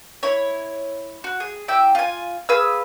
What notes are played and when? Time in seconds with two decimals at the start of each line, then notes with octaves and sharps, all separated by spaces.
0.23 E4 C#5
1.24 F#4
1.40 G#4
1.68 E4 G4 G5 E6
1.95 F4 G#5
2.49 G#4 B4 F5 E6